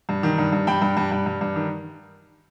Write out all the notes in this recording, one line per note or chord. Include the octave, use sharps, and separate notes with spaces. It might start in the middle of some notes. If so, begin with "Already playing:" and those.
G2
D#3
G2
G2
G2 G5 B5
G2
G2
G2
G2
G2
D#3